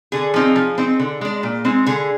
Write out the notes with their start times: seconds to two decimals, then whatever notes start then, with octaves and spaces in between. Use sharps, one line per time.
0.12 D3 G#4
0.34 F3 C4 D#4
0.56 F3
0.78 C4 D#4
0.99 D3
1.21 G#3 D4
1.43 A#2
1.65 G#3 C4 D#4
1.86 D3 G#4